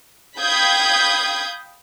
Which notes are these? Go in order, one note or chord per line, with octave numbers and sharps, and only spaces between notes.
F5 G5 B5 D#6 G6 G#6